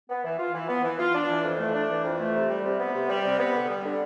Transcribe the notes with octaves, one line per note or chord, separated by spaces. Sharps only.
B3
E3
F4
E3
B3
E3
F4
D4
E3
F2
A3
D4
E3
F2
A3
C3
G3
C3
B3
C3
G3
C3
B3
D3
G3
D3